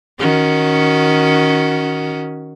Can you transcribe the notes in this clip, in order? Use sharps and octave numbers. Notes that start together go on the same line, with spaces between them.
D#3 C#4 F#4